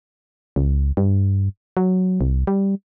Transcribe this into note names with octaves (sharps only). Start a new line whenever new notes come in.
C#2
G2
F#3
C2
G3